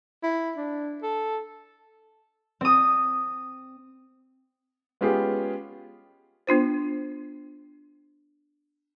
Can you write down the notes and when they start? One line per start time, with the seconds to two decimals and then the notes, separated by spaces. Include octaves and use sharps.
0.23 E4
0.57 D4
1.02 A4
2.61 C4 D#6
5.01 G#3 B3 C#4 F4 G4 G#4
6.47 B3 D4 F4 C5